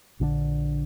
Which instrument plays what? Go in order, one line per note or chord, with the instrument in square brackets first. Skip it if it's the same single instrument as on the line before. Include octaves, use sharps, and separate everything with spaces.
[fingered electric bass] A#1 D3 D#3 D4